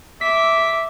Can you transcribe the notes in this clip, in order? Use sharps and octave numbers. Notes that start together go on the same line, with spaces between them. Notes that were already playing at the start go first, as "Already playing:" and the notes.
E5 D6 B6